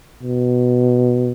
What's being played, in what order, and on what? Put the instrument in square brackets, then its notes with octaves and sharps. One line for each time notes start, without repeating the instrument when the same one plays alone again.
[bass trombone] B2